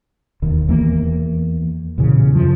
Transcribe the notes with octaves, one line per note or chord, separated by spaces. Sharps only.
E1 D#2
E2 E3 A#3
E2 A#2 C#3 E3
F#2 F3